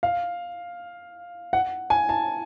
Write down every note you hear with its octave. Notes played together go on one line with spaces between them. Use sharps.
F5
F#5
G#5
A5